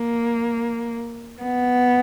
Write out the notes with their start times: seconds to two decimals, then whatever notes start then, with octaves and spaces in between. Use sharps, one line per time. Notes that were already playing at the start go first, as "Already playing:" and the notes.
Already playing: A#3
1.42 B3